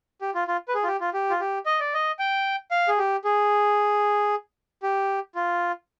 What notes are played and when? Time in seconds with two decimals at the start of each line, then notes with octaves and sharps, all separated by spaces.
0.21 G4
0.35 F4
0.48 F4
0.68 B4
0.74 G#4
0.83 F4
0.87 G4
1.00 F4
1.14 G4
1.30 F4
1.40 G4
1.66 D#5
1.80 D5
1.94 D#5
2.19 G5
2.71 F5
2.88 G#4
2.98 G4
3.24 G#4
4.83 G4
5.35 F4